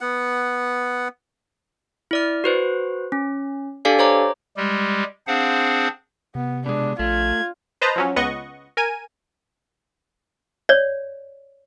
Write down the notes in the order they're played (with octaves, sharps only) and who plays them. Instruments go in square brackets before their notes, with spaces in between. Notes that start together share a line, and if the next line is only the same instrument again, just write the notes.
[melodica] B3 F#5
[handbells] E4 D5 F6
F#4 B4 C5
C#4
D4 G4 A4 D5 F5 G#5
C5 C#5 A#5 D6
[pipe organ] G3 G#3 G4
C4 D4 G#4 C5 F5 F#5
[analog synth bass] C3 [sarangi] B3
[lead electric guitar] B2 G#3 [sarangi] D4
[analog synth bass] A#1 [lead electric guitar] A3 [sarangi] F4 [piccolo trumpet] G#6
[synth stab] B4 C5 D#5 A5 A#5
F3 F#3 C#4
C#2 B3 D#5 F#5 C#6
A#4 G#5 D#7
[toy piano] C#5 D5